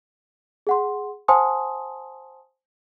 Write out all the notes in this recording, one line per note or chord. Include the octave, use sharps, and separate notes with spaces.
G#4 F#5 C6
C5 F#5 G#5 A5 C6 D#6